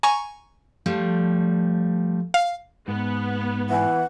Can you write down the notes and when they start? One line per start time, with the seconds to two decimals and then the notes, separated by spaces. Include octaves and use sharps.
0.03 G#5 A#5 C#6
0.86 F3 G3 A3
2.34 F5
2.88 G#2 B3
3.70 E3 F#5